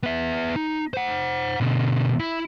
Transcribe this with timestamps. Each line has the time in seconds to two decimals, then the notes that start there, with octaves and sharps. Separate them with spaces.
0.03 B3 E5
0.56 D#4
0.94 C5 F#5
1.60 B2 D3
2.20 E4